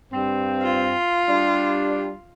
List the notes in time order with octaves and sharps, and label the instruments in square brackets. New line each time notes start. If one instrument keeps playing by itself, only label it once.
[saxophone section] G2 C4
[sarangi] F4
[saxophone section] G3 D4